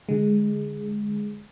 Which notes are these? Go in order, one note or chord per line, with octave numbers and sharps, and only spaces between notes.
D3 G#3